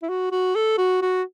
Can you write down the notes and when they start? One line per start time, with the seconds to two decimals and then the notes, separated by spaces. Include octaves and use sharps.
0.03 E4
0.09 F#4
0.32 F#4
0.56 A4
0.78 F#4
1.02 F#4